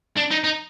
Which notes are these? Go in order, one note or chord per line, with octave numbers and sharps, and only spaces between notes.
D4
D#4
D#4